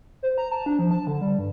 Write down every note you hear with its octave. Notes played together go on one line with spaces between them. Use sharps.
C5
A#5
A5
D4
F3
A5
D3
G3
G2